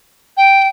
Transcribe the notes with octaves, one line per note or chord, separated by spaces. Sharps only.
G5